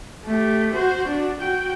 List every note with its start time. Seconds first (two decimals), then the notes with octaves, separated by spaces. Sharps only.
0.25 A3 G4
0.74 F#4 C5
1.08 D4 F#4
1.40 F#4 G5